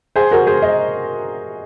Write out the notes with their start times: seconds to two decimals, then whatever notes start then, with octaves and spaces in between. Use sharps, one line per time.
0.16 G#4 C5
0.31 F#4 A#4
0.47 G#4 C5
0.62 C5 D#5